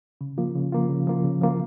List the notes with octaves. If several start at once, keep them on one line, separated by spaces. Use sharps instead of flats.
C#3
F3 A#3 F4
C#3
F3 A#3 F4
C#3
F3 A#3 F4
C#3
F3 A#3 F4